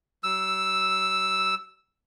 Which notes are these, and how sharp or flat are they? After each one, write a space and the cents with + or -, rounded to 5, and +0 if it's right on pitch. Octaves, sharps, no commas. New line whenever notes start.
F#3 +45 E6 +0